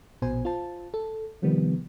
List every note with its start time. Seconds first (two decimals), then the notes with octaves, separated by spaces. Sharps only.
0.22 A#1 B2 C5 G#5
0.45 F4 C5 A5
0.94 A4
1.42 C3 D#3 F3 G3 B3